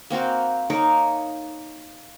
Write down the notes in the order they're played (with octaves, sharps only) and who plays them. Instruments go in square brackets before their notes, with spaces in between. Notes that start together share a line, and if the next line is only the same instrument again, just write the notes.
[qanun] A#3 C4 F#4 F5
A#3 D#4 A#4 C#5